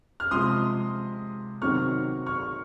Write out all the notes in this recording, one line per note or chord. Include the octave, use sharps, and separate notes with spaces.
F6
C3 F3 G#3 C6 D#6
C3 D#3 F#3 C4 D#4 C#6 F6
C#6 F6